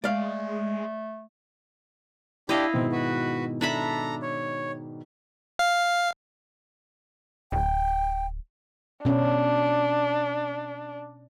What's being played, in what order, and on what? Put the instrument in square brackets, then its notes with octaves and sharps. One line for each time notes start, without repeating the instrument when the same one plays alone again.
[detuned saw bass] G#3 [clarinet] A3 [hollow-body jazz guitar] D5 F5
[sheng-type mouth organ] D4 G4 [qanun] E4 D#5 F5
[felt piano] G#2 B2 D#3 [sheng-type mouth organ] C4
[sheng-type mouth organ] F#4 B4
[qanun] D4 E5 B5 [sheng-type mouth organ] A4 A#5
[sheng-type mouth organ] C#5
[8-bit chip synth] F5
[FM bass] D1 [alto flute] G5
[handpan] B2 C#4 [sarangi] D4